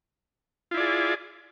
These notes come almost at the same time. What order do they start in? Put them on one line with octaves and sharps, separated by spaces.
F4 E4 D5 G#4